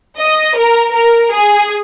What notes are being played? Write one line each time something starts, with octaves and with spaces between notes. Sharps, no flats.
D#5
A#4
A#4
G#4